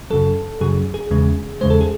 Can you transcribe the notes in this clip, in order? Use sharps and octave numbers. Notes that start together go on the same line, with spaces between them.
F#2 C#3 F#3 A4
F#2 C#3 F#3 G#4
G#4
E2 C#3 G#3
E2 C#3 G#3 C5
A4
G#4